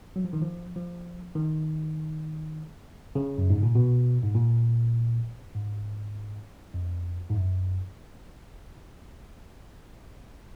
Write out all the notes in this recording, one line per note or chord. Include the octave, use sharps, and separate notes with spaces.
F#3
F3
D#3
F3
F3
D#3
C#3
F#2
G#2
A#2
B2
G#2
A#2
G#2
F2
G#2
F#2